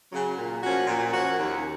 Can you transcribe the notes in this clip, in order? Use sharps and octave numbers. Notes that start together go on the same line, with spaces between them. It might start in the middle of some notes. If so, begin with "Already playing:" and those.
C#3 F#3
A#2
F3 A#3 C#4 F#4
A#2
F3 A#3 C#4 F#4
D#2